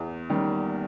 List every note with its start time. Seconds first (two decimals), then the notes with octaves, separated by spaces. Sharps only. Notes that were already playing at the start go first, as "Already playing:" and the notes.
Already playing: E2
0.30 D#3 G3 C#4